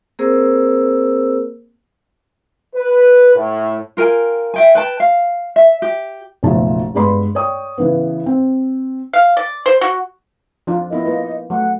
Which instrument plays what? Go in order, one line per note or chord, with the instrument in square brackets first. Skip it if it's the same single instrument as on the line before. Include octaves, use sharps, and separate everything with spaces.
[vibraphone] A#3 C4 G#4 A#4 C5 E6
[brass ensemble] B4
A2
[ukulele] F4 A#4 G5 G#5
E5 G5 G#5
B4 G5 A5
F5
E5
G4
[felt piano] F#1 B1 B2 F3 A3 A5
G2 G#3 B3 D5 B5 C6
C#5 D5 G5 D#6
C#3 E3 B3
C4
[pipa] F5
D5
C5
F#4
[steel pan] F3 D4 F4
[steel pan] B3 E4 A#4 [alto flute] D#5
[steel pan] A#3 F4 B4
[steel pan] F#3 A3 [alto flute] F#5